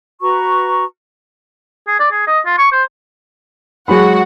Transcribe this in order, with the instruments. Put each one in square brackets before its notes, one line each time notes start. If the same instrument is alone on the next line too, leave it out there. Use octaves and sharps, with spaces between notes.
[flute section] F#4 B4 A#5 C#6
[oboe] G#4
D5
G#4
D#5
F4
C#6
C5
[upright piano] F#3 G#4 B5 [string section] G#3 F#4 F#5